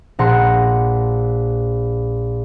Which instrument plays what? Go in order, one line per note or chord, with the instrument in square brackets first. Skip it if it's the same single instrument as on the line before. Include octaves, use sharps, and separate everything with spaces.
[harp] A#1 A#4 F#5 C6 C#7